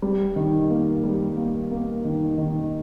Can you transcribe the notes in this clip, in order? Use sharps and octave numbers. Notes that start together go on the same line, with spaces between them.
G3
D#3
A#3
G3
A#3
A#3
D#3
D#3